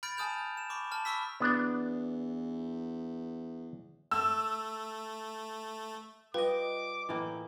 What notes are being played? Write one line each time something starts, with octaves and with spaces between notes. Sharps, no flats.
B5 F6 G6 A6 D7
G#5 A5 D#6 F6 G6 F7
E7
B5 C#6 D6
A5 F6
B5 C#6 E6 B6
E2 B3 D4
A3 E6
G3 F4 B4 D#5 D6
A2 E3 A#3